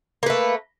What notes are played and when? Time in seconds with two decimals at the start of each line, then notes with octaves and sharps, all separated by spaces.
0.23 A#3
0.26 B4
0.30 A3